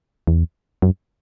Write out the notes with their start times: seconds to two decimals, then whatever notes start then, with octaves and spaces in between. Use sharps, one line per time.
0.27 E2
0.82 F#2